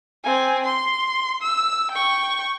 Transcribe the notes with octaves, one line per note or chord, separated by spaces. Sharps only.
C4 G#5
C6
E6
G5 C#6